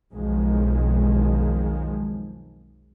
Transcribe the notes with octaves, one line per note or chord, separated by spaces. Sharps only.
B1 F2 D#3 F3 G#3